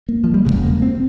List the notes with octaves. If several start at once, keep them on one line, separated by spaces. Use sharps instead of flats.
A#3
F3
G3
E2 C#3 G#3
E1
A#3
C4